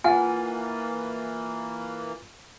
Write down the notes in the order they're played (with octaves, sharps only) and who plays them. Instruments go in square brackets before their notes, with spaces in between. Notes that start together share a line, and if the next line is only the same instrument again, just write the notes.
[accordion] E3 A#3 [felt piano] F4 [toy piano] F#5 G#5